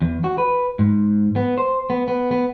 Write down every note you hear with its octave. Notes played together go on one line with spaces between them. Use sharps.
E2
F#4
B4
G#2
B3
C5
B3
B3
B3